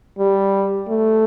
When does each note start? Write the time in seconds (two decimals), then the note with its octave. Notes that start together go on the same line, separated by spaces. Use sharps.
0.19 G3
0.89 A3